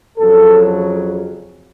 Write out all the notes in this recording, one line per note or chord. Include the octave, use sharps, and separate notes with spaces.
F2 C#3 F#3 A4